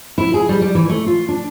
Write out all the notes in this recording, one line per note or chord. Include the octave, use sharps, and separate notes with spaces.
E4
G#4
G3
G3
E3
A3
F4
D4